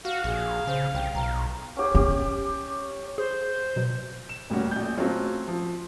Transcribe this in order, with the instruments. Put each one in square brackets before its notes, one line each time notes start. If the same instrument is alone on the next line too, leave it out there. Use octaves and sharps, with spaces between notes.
[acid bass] F#4 [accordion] F5
[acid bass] A#1 [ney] G#4
[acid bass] C#3 [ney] C5
[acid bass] C2 [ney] G5
[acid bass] B1 [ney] A#5
[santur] C#4 G4 G#4
[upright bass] C#4 [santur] G4
[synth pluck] G#4 [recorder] C5
[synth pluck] B2 F#3 B4
[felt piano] E7
D#1 D2 G3 C#4 F#4
A#1 G6
F#3 A3 C4 C#4 F4
F3